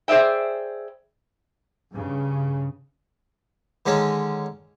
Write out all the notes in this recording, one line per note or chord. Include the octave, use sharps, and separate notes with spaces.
G#4 C5 D5 E5 G5
G2 C#3
D3 D#3 G#3 C#4